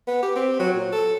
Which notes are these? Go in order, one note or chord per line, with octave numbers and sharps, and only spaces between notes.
B3
G4
C4
F#3
A#2
A4